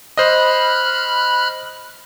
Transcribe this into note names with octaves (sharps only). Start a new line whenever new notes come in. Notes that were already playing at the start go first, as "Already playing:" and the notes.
C5 D#5 B5 F6 F#6